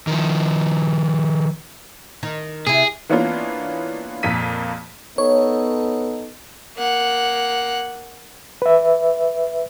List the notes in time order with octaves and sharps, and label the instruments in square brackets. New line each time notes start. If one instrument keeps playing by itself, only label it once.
[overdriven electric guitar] D#3 F3
[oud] D#3
[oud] C3 E4 [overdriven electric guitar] G#4
[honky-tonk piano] E3 A#3 B3 C#4 D4 F4
F2 A#2 A#3 B6 D#7
[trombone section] B3 D#4 A4 [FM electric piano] C#5
[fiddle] A#3 F#5
[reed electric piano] B4 E5